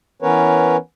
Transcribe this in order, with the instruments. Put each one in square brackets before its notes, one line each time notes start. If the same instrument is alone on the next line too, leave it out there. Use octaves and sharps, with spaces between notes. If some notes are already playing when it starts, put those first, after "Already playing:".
[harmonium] E3 B3 C#4 A#4 B4 C#5